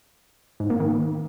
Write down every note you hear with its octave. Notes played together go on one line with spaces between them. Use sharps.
G#2
A#3
D#3